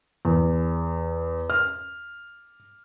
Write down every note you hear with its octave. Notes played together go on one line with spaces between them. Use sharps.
E2
F6